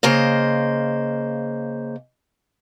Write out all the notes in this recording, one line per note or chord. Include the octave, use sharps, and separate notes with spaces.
C#3 A#3 C5 D#5